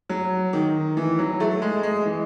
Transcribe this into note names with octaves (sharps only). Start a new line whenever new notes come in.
F#3
D#3
E3
F#3
A3
G#3
G#3
E3